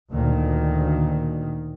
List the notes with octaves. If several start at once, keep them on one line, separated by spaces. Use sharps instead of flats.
D2 A#2 D#3